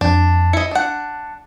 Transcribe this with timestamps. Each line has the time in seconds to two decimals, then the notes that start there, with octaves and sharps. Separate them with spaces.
0.01 F2 D4
0.53 E4 D#5 C#7
0.71 D4 F#5